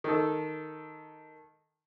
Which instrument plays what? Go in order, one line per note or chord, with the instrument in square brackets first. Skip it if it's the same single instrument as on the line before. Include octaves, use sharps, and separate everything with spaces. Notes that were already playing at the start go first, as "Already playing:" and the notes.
[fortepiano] D#3 A4